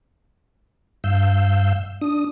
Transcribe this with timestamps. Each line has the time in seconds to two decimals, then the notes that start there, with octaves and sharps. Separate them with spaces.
1.04 G2 F5 E6 G6
2.01 D4 D#6